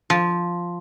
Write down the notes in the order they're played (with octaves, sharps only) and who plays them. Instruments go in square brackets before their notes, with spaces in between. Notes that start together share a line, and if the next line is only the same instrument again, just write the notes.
[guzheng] F3